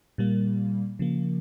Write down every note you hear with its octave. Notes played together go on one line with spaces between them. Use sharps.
A#2 G3 A#3
C#3 F3 A#3